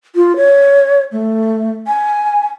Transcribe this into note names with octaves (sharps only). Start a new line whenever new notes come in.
F4
C#5
A3
G#5